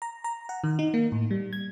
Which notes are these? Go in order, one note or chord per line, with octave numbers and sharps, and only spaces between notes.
A#5
A#5
F#5
D#3
D#4
A#3
A2
G3
G#6